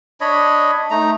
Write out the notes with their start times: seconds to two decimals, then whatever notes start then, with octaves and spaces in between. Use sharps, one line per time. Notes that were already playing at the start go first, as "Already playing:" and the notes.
0.21 D4 C#5 D#5 B5
0.91 A3 D#4 A#5